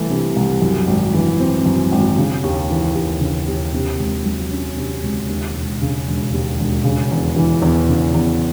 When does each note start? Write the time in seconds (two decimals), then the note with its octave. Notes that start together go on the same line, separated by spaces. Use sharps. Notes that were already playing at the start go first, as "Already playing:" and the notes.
Already playing: C2 E3 A3
0.11 C3
0.36 C2
0.62 F#2
0.87 G#1
1.14 E3
1.40 C4
1.66 F#2
1.92 G#1
2.18 C#3
2.43 D#2
2.70 E3
2.95 D#2
3.21 C#3
3.48 D#2
3.74 C3
3.99 C#2
4.25 F#3
4.51 C#4
4.78 C3
5.03 C#2
5.29 D#2
5.54 E1
5.82 C#3
6.07 E1
6.33 D#2
6.59 E1
6.84 C#3
7.11 E2
7.36 E3
7.62 E2
7.89 C#3
8.14 E2